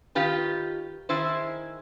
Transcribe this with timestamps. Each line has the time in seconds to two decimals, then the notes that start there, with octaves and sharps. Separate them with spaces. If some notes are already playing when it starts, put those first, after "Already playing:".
0.15 D#3 F4 G4 B4
1.09 D#3 E4 G#4 C5